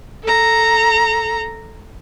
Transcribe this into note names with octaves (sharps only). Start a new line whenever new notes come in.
A4 A#5